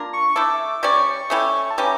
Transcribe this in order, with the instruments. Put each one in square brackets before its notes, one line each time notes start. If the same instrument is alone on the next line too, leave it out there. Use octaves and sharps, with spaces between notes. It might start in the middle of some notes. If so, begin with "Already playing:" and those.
Already playing: [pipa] A#3 D4 F4 A#4
[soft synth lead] C#6
[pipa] A3 E4 A4 [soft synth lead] D6
[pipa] G3 C#4 G4 D5 [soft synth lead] C#6
[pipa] A3 C#4 E4 G4
[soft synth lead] A5
[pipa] E3 G3 C#4 G4 [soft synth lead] A#5